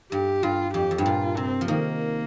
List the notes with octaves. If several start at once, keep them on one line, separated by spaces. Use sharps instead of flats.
G2 G4
G2 F4
F2 G4
F2
G2
A#2 F4
C3 C4
F3
D#3 A#3